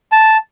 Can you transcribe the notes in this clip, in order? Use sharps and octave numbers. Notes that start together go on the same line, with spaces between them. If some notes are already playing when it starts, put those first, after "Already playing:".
A5